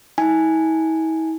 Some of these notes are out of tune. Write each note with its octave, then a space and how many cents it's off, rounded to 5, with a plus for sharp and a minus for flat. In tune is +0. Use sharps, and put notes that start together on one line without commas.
E4 -45 G#5 +0